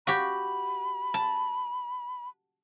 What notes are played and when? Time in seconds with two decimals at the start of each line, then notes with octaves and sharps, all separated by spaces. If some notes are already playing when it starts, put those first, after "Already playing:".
0.07 F#4 G4 B5
1.14 A5